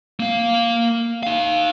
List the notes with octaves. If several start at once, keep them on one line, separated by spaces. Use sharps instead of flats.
A#3 F5
D#4 F5